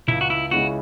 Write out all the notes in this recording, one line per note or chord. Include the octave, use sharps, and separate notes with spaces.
C#2 E4
F#4
E4
C#3 G#3 C#4 E4 F#4